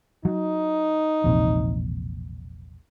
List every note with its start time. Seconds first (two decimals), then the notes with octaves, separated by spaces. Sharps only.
0.25 F#3 D#4
1.24 E1 A#1 C3